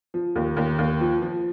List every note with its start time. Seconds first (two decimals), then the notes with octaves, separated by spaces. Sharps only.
0.14 F3
0.36 D#2
0.57 D#2
0.79 D#2
1.01 F3
1.22 F3